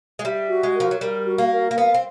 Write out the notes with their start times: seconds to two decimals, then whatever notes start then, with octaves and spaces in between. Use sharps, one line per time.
0.19 G#3
0.24 G3 E5
0.50 F#4
0.63 G#3
0.76 F3 A#4
0.91 F#3
1.01 G3 A#4
1.26 F#4
1.38 A#3
1.51 A#4
1.71 A#3
1.77 B3 F5
1.94 C4